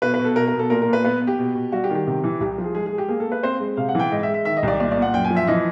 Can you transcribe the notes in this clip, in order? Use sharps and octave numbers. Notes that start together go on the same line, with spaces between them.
B2 B4
B4
B2
A4
B2 A#4
A#4
B2
A4
A#2 A#4
A#4
A#2
B4
B3 B4
B3
G4
B2
B2
G3 F#4
G4
D#3
G4
C3
E3
C2 G4
F3
G#4
G#3 G#4
G#4
G#3
G4
A#3 G#4
A4
A#3 B4
C4 C5
G#3
C3 F5
F#5
E3 G5
G#2 D#5
E5
G#3
E5
D#3 E5
D#5
C2 D5
A#2 D5
D5
A#2
F#5
F#2 G5
G#5
F3
E5
E3 D#5